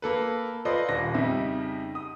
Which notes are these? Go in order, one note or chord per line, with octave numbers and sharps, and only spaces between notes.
A#3 A4 B4
F4 A4 B4 C5 D5 D#5
D#1 A#6
F2 C#3 G3 D#4 E5
D#6